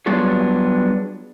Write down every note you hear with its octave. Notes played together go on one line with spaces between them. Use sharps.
F#3 G3 B3 D4 F4 G#4